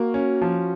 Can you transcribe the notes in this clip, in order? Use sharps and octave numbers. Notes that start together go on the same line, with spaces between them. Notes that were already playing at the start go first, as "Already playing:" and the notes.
Already playing: A#3 F#4
C#4
F3